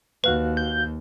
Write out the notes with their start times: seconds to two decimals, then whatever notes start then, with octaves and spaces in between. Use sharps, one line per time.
0.24 D#2 F#4 B4 F5 F#6
0.57 G6